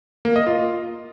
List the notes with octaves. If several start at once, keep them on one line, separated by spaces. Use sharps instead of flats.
A#3
D#5
F4